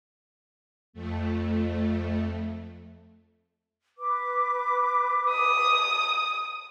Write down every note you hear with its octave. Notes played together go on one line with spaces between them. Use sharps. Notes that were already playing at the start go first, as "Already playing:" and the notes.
F2 A3
B4 D6
D#6